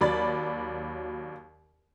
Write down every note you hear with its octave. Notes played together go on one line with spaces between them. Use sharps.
D#2 F#3 D5 B5 A6